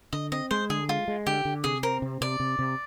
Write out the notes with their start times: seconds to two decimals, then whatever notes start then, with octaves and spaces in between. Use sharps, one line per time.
0.13 D3 D#5
0.32 C4 D#5
0.51 G#3 C5
0.70 D3 G#4
0.89 G#3 F4
1.08 G#3
1.26 D3 G4
1.45 D3
1.64 C3 G#4
1.83 C4 A#4
2.02 C3
2.21 C3 D5
2.40 C3
2.59 C3